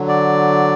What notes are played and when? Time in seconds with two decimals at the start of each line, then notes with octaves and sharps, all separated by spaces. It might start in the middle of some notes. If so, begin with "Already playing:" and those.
Already playing: D3 F#3
0.08 D5